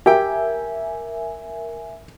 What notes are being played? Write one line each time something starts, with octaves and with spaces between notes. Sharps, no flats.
G4 A#4 E5 G5 G#5